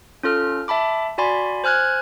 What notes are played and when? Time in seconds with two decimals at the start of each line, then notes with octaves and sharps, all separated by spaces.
0.23 C#4 F4 A4 F6
0.68 E5 A5 B5 D6
1.18 F#4 D5 G#5 B5 C6
1.64 C5 G#5 F6 F#6 G#6